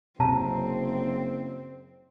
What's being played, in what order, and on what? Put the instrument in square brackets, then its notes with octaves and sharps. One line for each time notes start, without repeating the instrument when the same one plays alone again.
[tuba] F#1 [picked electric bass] C3 [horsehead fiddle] C4 [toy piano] A5 A#5